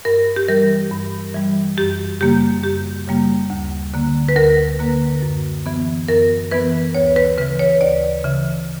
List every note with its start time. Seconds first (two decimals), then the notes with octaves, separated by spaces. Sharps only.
0.05 G2 A#4
0.36 G4
0.48 E3 G3 A#4
0.91 G2
1.34 E3 G3
1.77 F#2 G4
2.21 C#3 G3 A#3 G4
2.64 F#2 G4
3.07 C#3 G3 A#3
3.50 D2
3.94 D3 A#3
4.29 B4
4.36 D2 A#4
4.79 D3 A#3
5.22 F#2
5.66 E3 B3
6.08 F#2 A#4
6.51 E3 B3 B4
6.95 D2 C#5
7.16 B4
7.38 C#3 E3 B4
7.59 C#5
7.81 D2 D5
8.24 C#3 E3